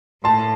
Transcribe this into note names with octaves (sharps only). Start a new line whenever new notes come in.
A2 A5 C6